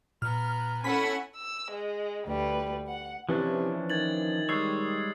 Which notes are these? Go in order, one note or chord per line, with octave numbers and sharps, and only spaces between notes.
A#2 B3 A#5 F6
C#4 E4 A4 F#5 G#5 B5 B6
E6
G#3
D2 G3 B4
F#5
C3 E3 F3 C#4 D4
D#3 G#6 A6 F#7
G3 G#3 C#5 E6 G#6 C7